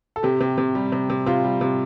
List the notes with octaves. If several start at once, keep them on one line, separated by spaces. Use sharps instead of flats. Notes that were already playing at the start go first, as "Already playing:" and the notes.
A4
C3 G4
C3
C3
G3
C3
C3
C3 F4
G3
C3